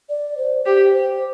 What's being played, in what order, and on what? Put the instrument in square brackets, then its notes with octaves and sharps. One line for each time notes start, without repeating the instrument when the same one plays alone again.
[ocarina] D5
C5
[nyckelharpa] G4 [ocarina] C5
[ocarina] C5